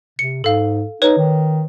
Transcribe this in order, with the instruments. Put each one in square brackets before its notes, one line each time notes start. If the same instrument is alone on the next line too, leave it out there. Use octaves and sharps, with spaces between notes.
[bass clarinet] C3 [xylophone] C#7
[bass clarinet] G#2 [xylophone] A4 F5
[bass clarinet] D#4 [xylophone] B4 C#5
[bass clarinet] D#3